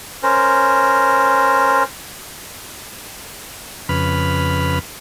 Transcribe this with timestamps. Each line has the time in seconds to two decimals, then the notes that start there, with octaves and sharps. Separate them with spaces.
0.23 C#4 A#4 C5
3.89 F2 C#3 B4 B5 F6